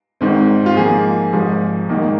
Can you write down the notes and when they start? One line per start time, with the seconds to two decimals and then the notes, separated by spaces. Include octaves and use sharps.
0.21 G#1 G#2 D#3 C4
0.66 F4
0.77 G#2 F3 A#3 G#4
1.33 G#1 G#2 F3
1.89 G#1 G#2 D#3 A#3